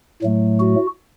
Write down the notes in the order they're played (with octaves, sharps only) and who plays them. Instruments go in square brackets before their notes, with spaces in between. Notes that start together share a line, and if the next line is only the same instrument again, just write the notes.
[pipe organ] A2 F#3 A3
F#4